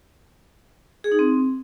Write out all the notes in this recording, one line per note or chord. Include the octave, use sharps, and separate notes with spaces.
G#4
D#4
C4